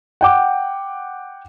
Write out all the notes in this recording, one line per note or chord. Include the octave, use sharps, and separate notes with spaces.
F#5 G5 D6